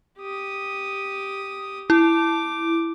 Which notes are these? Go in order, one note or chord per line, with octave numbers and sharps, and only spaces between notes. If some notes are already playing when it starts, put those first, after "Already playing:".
G4 D#6
E4 D6